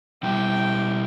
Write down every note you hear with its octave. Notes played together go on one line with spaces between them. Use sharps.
B2 G3 E4 G4 G5